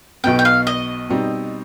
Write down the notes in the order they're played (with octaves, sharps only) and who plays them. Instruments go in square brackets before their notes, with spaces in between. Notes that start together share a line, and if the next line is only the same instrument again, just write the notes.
[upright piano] B1 B2 B3 [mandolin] G5
[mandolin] G5
F5
D#5
[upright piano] B2 G3 C4 D#4